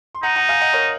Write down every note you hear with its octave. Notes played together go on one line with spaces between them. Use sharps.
C6
D#4 F#5 A#5
F#5 A#5
F5 G#5
D#5 F#5
A#4 C#5